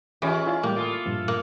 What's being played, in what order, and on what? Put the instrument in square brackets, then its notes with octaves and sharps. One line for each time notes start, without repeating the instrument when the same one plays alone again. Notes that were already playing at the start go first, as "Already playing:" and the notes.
[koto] E3 [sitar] G#3 C#4 [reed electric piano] F4 G4
[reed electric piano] E4 F4 D5
[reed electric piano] A2 G3 G5 [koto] A#3
[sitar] A3 E4 F4 [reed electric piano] D6 D#6
[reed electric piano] G2 A#2 F3
[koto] A#3